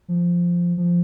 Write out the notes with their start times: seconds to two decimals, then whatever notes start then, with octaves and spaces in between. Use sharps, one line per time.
0.08 F3
0.77 F3